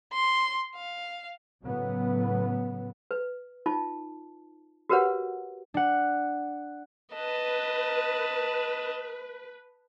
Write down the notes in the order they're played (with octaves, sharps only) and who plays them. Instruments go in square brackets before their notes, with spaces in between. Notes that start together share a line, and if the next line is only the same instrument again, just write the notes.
[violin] C6
F5
[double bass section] A2 C#3 F#3 B3
[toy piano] B4
D#4 F4 A5
F#4 G4 A#4 B4 C#5 F#5
[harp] D4 F#5
[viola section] B4 [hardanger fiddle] D#5 A5